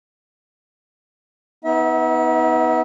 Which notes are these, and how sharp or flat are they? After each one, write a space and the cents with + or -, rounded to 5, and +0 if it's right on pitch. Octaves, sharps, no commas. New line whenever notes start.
B3 +0 D#4 +35 E5 -30